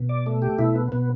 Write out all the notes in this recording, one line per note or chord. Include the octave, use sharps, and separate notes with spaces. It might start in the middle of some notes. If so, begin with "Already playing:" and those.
Already playing: B2
D5
A3
G4
B2 E4
B3
B2 B3